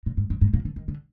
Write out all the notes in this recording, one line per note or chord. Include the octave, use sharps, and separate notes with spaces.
A#2
G#2
G2
G#2
A#2
D3
D#3
D3